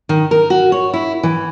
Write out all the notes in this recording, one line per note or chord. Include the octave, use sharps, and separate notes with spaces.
D#3
A#4
F#4
C#5
E4
E3